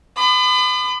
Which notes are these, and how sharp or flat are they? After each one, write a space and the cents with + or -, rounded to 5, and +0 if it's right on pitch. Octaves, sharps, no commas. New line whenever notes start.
B5 +35 D#6 -45